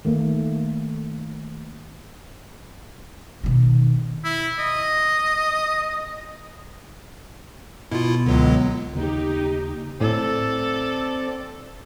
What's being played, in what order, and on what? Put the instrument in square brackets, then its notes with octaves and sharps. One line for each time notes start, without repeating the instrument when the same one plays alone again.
[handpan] D#3 A3 A#3
[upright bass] B2 D#3
[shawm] E4
D#5
[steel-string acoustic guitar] B2 [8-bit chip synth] E4 F4
[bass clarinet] C#2 [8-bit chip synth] D3 F#3 G#3
[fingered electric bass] D#2 C#3 A#3 [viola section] D#4 G4
[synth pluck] A2 [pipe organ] C4 D5 [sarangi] A4